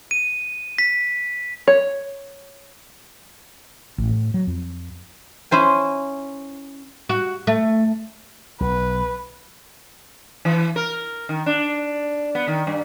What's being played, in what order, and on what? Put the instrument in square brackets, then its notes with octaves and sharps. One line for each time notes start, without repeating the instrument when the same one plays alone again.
[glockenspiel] D#7
B6
[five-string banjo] C#5
[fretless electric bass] A1
A2
F#3
F2
[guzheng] C#4 E4 C5 G#5
[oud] F#4
A3
[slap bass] B1 [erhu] B4
[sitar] E3
A#4
D#3
D4
B3
D#3
G2